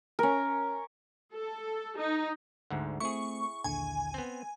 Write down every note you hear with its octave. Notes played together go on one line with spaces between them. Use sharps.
C#4 A#4
A4
D#4
D2 G#2 D3 F#5
A3 C4 E4 G#4 C#6
A#1 D#2 D3 G#5
B3 C4